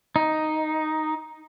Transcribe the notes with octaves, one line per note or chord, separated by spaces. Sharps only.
D#4